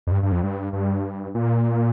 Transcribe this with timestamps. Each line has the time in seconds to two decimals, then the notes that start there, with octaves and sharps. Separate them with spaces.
0.07 F2
0.12 G2
0.23 G2
0.32 F2
0.43 G2
0.73 G2
1.35 A#2